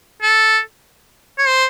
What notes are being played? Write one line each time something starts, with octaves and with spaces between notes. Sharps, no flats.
A4
C#5
C5